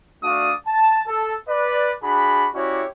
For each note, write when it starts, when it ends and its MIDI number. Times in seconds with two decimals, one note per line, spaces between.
0.24 0.53 57
0.24 0.53 62
0.24 0.53 66
0.24 0.53 74
0.24 0.53 77
0.24 0.53 87
0.67 1.02 81
1.08 1.35 69
1.49 1.93 71
1.49 1.93 74
2.03 2.48 62
2.03 2.48 66
2.03 2.48 68
2.03 2.48 83
2.55 2.85 61
2.55 2.85 64
2.55 2.85 66
2.55 2.85 67
2.55 2.85 73
2.55 2.85 74